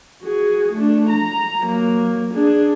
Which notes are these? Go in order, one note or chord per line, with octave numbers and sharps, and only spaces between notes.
F#4 G#4
A3 D4
A#5
F#3 A#3
D4 G#4